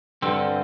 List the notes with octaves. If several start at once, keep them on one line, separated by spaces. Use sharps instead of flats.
G2 D3 C4